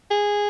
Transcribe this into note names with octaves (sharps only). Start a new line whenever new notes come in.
G#4